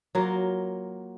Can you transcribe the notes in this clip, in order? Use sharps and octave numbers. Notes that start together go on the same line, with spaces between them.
F#3 A#3 F4